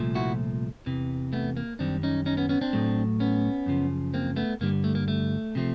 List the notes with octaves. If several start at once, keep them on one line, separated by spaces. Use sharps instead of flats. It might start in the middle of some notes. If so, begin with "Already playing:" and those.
Already playing: C2 A#2 F3 A3
E4 F#4
E2 C3 E3
A3 B3
A#3
F#2 D#3 G3 C4 D4
C#4 D#4
C#4 D#4
B3 C#4
B3 C#4
C4 D4
A2 F#3 A3
B3 C#4
F#2 C#3 F3
A#3 C4
A3 B3
G2 D3 G3 A#3
A3
A#3
A3
C3 F3 A3